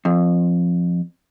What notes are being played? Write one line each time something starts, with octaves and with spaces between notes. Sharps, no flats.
F2